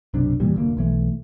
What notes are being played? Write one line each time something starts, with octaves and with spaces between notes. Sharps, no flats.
B1 F#2 C3 D4
D#2 A#2 E3 G3
F1 D2 A#3
B1 E3 A3